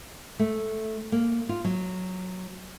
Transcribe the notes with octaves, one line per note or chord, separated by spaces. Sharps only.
A3
A#3
F4
F#3